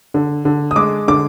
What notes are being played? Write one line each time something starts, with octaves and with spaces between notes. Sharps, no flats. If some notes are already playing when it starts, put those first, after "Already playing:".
D3
D3
D#6
G#3 D6
D3 D6